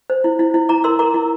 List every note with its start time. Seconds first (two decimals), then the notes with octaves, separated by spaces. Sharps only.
0.10 C5
0.24 E4
0.39 E4
0.54 E4
0.69 E4 A#5 D6
0.84 A#4 C6 E6
0.99 A#4 A#5 D6
1.14 E4